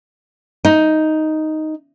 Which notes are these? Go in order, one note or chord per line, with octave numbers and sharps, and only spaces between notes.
D#4